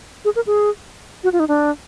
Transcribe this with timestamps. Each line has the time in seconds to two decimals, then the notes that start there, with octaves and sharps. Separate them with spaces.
0.25 G#4
0.36 A#4
0.47 G#4
1.24 F#4
1.33 F4
1.40 D#4
1.48 D4